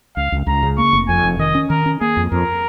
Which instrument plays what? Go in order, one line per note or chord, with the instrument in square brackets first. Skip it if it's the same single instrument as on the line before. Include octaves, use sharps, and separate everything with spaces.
[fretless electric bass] C#2 [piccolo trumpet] F5
[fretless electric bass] C#2
[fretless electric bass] C#2 [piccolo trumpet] A#5
[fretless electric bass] C#3
[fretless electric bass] A#3 [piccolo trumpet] C#6
[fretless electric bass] F1
[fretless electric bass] F2 [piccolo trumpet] G#5
[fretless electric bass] F1
[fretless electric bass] D#3 [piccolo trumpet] D#5
[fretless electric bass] C#4
[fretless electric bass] D#3 [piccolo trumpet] A#4
[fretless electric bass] C#4
[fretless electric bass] A#3 [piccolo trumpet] G#4
[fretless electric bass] F2
[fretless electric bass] F2 [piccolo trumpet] A#4